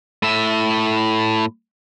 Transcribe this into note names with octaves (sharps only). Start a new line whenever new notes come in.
A2 E5